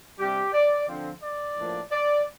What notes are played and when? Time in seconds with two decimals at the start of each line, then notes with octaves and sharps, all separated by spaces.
0.19 C3 G3 D4 G4
0.54 D5
0.87 D3 F3 C4
1.22 D5
1.56 A2 F3 A#3 D4
1.92 D5